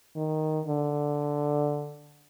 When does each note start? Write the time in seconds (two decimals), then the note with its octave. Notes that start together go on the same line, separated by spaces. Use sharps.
0.16 D#3
0.66 D3